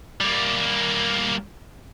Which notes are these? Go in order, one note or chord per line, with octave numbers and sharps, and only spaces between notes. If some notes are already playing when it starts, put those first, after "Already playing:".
G3 A#3